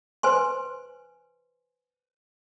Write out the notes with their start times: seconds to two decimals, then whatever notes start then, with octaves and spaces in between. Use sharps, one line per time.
0.23 B4 C5 G#5 C6